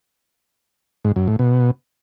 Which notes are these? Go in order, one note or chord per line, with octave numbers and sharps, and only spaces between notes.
G#2
F#2
A2
B2